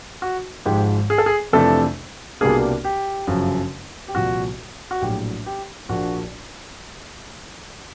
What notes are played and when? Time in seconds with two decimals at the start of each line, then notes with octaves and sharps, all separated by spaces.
0.22 F#4
0.66 G#1 G#2 F3 G#3 G4
1.10 G#4
1.18 A4
1.26 G#4
1.53 F2 C3 E3 A3 D4 A4
2.41 C2 B2 G3 A#3 D4 G#4
2.84 G4
3.27 G1 F#2 C#3 F3
4.08 G4
4.15 C2 A#2 F3 F#4
4.91 F#4
5.02 A#1 A2 F#3 G4
5.46 G4
5.89 A#1 A#2 F3 A#3 D4 F#4